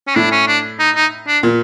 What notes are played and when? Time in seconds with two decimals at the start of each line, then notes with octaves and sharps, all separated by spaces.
0.07 C#4
0.16 A2 D4
0.32 C#4
0.47 D4
0.79 D#4
0.95 D#4
1.27 D4
1.43 A#2